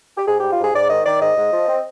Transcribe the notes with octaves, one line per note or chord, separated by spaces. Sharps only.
G4
G#2 G#4
G4
G3
F4
G#2 G#4
G#2 D5
D#3 D#5
D#3 D5
G#2 D#5
G#2
F3
C4